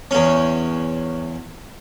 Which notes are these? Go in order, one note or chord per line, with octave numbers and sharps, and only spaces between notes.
E2 C#4